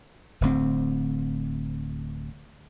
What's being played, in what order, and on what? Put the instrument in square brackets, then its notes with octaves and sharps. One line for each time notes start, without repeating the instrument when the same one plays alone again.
[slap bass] D1 D2 C4